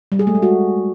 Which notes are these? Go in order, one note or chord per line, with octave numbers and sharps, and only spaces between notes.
G3
G#4
A3
G#3
F#4